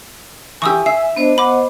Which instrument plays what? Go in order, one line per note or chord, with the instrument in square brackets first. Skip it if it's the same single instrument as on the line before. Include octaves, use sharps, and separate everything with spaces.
[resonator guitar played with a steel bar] E3 G4 [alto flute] G#5 [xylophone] C#6 D#6 E6
[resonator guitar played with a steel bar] E5 [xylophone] C7
[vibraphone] B3 C5 D#5 [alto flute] D4
[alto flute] F#5 [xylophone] B5 D6